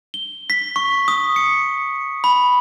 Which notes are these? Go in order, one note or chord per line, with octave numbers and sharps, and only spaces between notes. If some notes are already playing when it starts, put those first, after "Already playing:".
G7
B6
C#6
D#6
C#7
B5